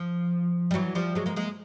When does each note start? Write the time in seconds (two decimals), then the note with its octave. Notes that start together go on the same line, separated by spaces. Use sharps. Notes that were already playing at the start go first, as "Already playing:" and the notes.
Already playing: F3
0.71 G3
0.74 E3 F#3
0.95 F3 G3
1.15 F#3 G#3
1.26 G#3 A#3
1.36 G#3 A#3